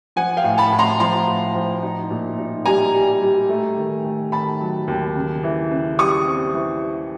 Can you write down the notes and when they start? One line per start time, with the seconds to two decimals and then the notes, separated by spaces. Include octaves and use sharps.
0.16 F3 F#5 G#5
0.37 F5 G5
0.44 A2
0.58 A5 B5
0.72 A2
0.79 A#5 C6
1.00 F3 A#5 C6
1.27 A2
1.55 F3
1.83 D#4
2.10 A#2
2.38 D#4
2.65 G3 G#5 A#5
2.94 G3
3.21 G3
3.49 A3
3.77 D#3
4.05 A3
4.32 D#3 A5 B5
4.61 F#3
4.88 D#2
5.16 C#3
5.43 E3
5.71 C#3
5.98 G3 C#6 D#6
6.26 C4
6.54 E3